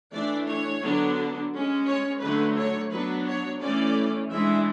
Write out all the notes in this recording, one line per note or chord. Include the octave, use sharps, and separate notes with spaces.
E3 A3 D4 D5
C#5
D3 F#3 B3 D4
G#3 C#4
C#5
D3 F#3 A3 D4 B4
C#5
F#3 B3 D4 B4
C#5
E3 A3 C#4 D5
E3 G#3 D4 E5